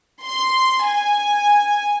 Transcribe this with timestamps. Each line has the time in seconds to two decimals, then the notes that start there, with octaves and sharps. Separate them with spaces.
0.23 C6
0.85 G#5